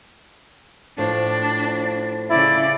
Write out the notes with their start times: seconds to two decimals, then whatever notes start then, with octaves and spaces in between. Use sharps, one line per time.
0.98 A2 F3 D4
2.30 C#3 E4 D5